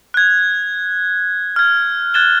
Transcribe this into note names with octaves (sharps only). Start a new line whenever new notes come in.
F#6 G#6
F6 G#6
F#6 G#6 A6 E7 G7